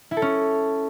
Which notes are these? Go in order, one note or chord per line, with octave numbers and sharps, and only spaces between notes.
E4
A4
C#4